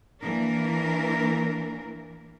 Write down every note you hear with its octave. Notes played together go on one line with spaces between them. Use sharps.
E3 A#3 D4 A#4